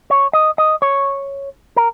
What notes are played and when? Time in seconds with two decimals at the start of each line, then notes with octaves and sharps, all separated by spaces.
0.10 C#5
0.33 D#5
0.58 D#5
0.82 C#5
1.76 A#4